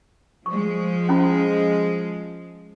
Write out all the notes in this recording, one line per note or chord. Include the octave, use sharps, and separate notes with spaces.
F3 G#3 C#6
C#4 E4 B5